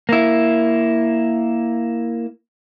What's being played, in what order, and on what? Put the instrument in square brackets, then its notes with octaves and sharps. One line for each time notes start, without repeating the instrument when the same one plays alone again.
[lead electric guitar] A#3 E4